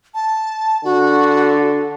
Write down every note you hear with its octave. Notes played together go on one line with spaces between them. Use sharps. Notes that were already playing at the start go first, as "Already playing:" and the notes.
A5
D3 F#4